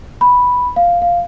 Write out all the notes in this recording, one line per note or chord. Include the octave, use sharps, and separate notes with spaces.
B5
F5
F5